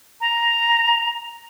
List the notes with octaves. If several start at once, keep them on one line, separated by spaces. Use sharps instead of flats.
A#5